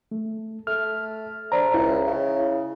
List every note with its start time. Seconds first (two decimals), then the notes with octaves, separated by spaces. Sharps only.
0.11 A3
0.67 A3 F6
1.52 D4 C5 A#5
1.74 C#2 E4
2.06 C#3